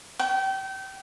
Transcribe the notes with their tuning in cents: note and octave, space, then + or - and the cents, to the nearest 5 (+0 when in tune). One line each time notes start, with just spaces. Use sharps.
G5 -30